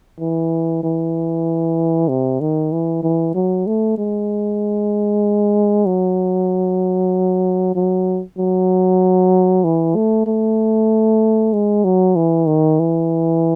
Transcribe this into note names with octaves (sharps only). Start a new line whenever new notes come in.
E3
E3
C3
D#3
E3
E3
F#3
A3
G#3
F#3
F#3
F#3
E3
A3
A3
G#3
F#3
E3
D#3
E3